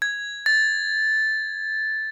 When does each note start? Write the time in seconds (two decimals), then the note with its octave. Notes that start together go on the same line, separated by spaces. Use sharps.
0.02 G#6
0.46 A6